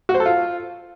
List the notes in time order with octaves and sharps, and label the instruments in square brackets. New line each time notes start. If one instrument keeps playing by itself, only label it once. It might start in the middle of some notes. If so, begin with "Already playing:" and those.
[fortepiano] F#4
C5
A4
F4